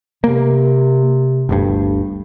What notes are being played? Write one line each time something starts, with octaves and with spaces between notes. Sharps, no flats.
C3 A#3
G1 D2 G2